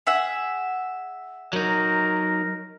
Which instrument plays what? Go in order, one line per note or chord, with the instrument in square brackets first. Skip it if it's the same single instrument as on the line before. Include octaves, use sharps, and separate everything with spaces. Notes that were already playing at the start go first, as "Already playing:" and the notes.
[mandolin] G#4 E5 F#5
[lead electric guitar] F#3 D#4 [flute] A#4